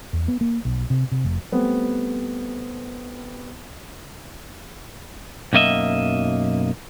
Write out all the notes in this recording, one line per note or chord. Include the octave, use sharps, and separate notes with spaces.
E2
B3
A#3
B1
C3
C3
F1
G3 A3 B3 C4
B1 F#2 A#3 D#5 E5